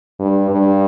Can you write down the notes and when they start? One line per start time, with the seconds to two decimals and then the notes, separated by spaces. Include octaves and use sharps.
0.19 G2
0.50 G2